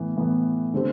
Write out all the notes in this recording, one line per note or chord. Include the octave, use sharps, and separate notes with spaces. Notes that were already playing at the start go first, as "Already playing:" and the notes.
Already playing: A2 E3 B3
A2 E3 B3
D3 A3 C4 G4